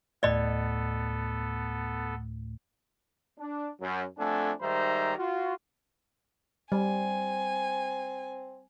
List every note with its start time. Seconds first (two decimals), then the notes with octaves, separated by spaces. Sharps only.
0.23 D2 A2 A3 B3 A4 D5 D#5 B5
3.39 D4
3.81 F#2
4.19 F2 A3 D4 A4 F#5 G#5
4.61 G#2 D#3 G3 C5 E5 A#5
5.18 F4 F#4
6.72 G3 C4 G#5